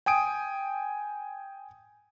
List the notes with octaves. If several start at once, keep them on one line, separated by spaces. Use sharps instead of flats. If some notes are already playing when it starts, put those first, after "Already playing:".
G5 G#5 D#6 D7